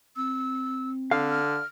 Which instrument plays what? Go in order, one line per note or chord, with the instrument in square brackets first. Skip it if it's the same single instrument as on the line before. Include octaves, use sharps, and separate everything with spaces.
[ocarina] C4 [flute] E6
[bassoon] D3 [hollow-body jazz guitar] F5
[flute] F6